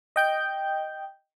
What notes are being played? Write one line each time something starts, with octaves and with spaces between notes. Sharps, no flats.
D#5 G5 G6